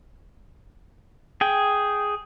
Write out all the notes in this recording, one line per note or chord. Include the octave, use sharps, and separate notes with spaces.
G#4 G5